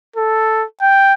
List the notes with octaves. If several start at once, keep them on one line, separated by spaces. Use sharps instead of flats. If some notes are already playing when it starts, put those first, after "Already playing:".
A4
G5